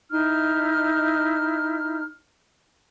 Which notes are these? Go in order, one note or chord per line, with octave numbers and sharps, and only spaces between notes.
D#4 E4 F6